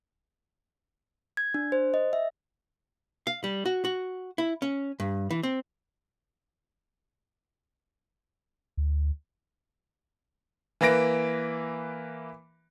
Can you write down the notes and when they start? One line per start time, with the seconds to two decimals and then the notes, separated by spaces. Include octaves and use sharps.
1.37 G#6
1.54 D4
1.72 C5
1.94 D#5
2.13 E5
3.27 F5
3.44 G3
3.66 F#4
3.85 F#4
4.38 E4
4.62 C#4
5.00 G2
5.31 E3
5.43 C4
8.77 D2
10.81 E3 A#3 B4 E5 A#6 D7